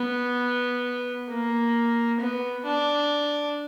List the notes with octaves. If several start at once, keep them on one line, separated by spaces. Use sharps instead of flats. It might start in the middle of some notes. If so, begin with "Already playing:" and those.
Already playing: B3
A#3
B3
D4